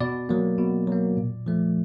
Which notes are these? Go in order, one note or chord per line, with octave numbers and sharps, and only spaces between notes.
B2 D5
F#3 A#3
B2
F#3 A#3
A#2
F3 A3